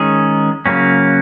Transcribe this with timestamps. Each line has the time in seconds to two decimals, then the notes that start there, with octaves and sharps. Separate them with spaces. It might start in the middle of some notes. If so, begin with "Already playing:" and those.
Already playing: D#3 G#3 C#4 G#4
0.66 C#3 F#3 A#3 C#4